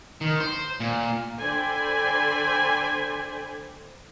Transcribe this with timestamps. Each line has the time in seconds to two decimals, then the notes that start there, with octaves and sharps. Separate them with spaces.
0.21 D#3
0.40 C5
0.80 A#2
1.38 D3 C5 D5 G5 G#5 B5